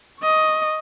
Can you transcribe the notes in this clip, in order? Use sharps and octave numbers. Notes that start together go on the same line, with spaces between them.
D#5 C#6